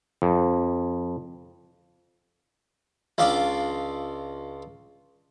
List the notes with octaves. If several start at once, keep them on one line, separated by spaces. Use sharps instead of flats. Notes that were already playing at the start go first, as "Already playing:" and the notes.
F2
C#2 D4 F4 D6